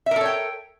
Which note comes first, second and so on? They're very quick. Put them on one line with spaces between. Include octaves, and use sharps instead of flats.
E5 A#4 A4 C#5 G5